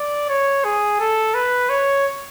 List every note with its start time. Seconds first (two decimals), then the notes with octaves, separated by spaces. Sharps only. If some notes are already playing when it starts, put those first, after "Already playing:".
Already playing: D5
0.29 C#5
0.64 G#4
1.00 A4
1.35 B4
1.69 C#5